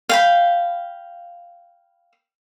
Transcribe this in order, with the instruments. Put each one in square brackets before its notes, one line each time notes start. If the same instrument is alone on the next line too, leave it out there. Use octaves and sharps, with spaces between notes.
[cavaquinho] F5 G5 B5